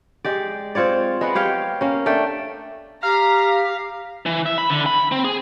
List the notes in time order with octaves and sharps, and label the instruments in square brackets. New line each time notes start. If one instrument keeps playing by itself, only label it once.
[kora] G#3 G4 D5
C4 F4 C#5 D5
G#3 B3 F#5
G4 C#5 F5 G5
A#3 C#4
A3 D4 G5
[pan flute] G4 [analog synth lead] F5 [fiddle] A#5
[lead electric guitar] E3
E5
B5
D3
B5
C4
G#4